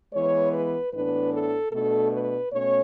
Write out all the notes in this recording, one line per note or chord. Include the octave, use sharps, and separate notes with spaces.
E3 G#3 B3 C#5
B4
A2 E3 B3 D4 B4
A4
B2 A3 D4 A4
B4
B2 A3 C#4 C#5